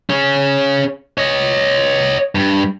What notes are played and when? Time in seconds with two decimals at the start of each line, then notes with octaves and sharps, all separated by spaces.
0.10 C#4 G#4
1.18 C#5 D#5
2.35 G2